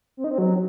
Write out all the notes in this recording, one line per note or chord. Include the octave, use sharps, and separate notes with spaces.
C4
D#4
C4
F#3